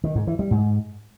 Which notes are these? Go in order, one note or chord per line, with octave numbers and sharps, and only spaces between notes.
D#3
G#2
E3
G3
G#2